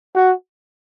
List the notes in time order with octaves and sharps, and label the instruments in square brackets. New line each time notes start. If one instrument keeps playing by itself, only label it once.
[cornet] F#4